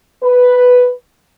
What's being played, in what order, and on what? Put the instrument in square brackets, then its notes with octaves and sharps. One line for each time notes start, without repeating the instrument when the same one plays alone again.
[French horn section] B4